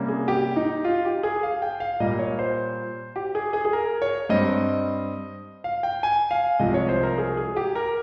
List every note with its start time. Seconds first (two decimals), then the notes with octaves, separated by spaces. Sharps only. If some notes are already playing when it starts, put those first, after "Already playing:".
Already playing: C3 G3 A#3 C#4
0.08 G#4
0.28 G4
0.56 D#4
0.84 F4
1.05 G4
1.23 G#4
1.43 F5
1.62 G5
1.80 F5
2.00 A#2 G3 A#3 D#5
2.19 C#5
2.39 C5
3.16 G4
3.35 G#4
3.53 G#4
3.65 G#4
3.73 A#4
4.02 C#5
4.29 G2 G3 C4 D#5
5.64 F5
5.83 G5
6.03 G#5
6.31 F5
6.60 C2 C3 F3 G#3 D#5
6.74 C#5
6.89 C5
7.03 A#4
7.18 G#4
7.37 G#4
7.57 G4
7.75 A#4